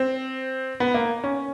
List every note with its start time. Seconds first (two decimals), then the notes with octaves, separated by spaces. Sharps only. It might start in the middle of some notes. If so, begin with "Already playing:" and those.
Already playing: C4
0.80 B3
0.94 A#3
1.24 C#4